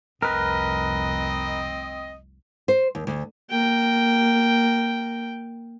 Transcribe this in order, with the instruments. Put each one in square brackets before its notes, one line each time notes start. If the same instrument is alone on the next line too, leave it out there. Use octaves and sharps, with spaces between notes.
[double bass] F1 C2 [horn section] C4 D#5 [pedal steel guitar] A#4 B4
[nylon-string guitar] C5
D#2
D2
[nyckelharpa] A#3 G5